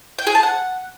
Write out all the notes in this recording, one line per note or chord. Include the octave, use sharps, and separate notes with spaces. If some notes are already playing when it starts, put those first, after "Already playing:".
G5
G#4
A5
F#5